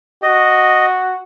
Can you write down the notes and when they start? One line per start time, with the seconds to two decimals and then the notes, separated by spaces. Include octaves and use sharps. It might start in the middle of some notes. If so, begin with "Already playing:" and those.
0.23 F#4 D#5